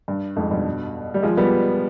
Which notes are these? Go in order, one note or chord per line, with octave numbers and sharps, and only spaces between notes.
G2
F2 G#2
G2 B2
G3
F3 G#3
G3 B3